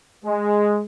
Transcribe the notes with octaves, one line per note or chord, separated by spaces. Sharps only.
G#3